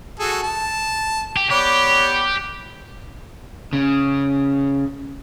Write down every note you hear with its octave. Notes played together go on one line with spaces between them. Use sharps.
F#4 G#4 A4
A5
G4
B3 G4 C#5 D5
C#3